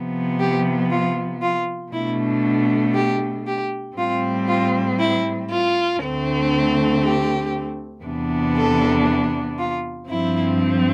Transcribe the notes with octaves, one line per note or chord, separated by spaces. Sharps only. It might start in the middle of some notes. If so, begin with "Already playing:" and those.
Already playing: C3 F3 B3
G4
F4
F4
B2 A3 D4 E4
G4
G4
A2 G3 C4 F4
F4
E4
F4
D2 D3 A3 C4
G4
E2 C3 E3 B3 D4
A4
F4
G2 F3 C4 E4